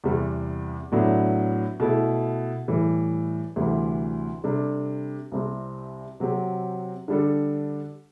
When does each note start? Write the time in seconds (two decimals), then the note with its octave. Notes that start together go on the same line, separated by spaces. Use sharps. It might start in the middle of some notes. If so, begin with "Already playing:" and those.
0.04 E2 C3 G3
0.92 A2 F#3 B3 D4
1.80 B2 A3 E4
2.68 A2 E3 G3
3.56 D2 C3 E3 G3
4.44 C3 G3 D4 A4
5.32 C2 C3 G3 C4
6.20 C3 F#3 C4 G4
7.08 D3 G3 D4 A4